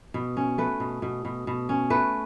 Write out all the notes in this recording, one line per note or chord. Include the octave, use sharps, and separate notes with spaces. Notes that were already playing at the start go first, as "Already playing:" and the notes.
B2
C#4
A3 B4
B2
B2
B2
B2
C#4
A3 B4